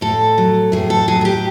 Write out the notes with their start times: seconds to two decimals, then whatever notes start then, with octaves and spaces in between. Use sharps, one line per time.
0.01 A2 A4
0.38 F#3
0.72 A2 G#4
0.90 A4
1.08 F#3 G#4
1.21 G#4
1.25 G4